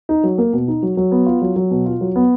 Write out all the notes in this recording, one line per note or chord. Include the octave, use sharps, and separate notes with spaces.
D#4
F#3
A#3
B2
D#4
F#3
F#3
B3
F4
F#3
F#3
B2
F4
F#3
B3